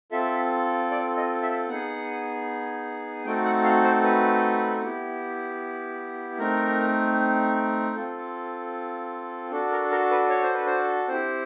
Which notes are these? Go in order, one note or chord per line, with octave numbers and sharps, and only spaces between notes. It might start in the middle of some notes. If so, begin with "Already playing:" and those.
C4 F4 A4 E5
D5
D#5
E5
B3 D#4 G#4 F#5
A3 C4 D#4 F#4 A4 G5
F#5
F5
C5
B4
B3 E4 G4
A3 C4 D#4 A#4
C4 F4 A4
D4 F#4 A4
A#4
A#4
B4
C#5
C5
B4
C5
C4 E4 G4 C5